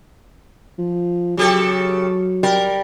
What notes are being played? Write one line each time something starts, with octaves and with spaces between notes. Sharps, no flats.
F3
C#3 F#3 G4 A4
G3 A#4